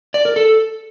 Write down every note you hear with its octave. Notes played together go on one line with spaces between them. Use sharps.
D5
A#4
A4